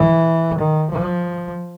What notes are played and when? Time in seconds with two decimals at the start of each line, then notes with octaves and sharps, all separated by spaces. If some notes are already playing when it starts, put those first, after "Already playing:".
Already playing: E3
0.58 D#3
0.91 F3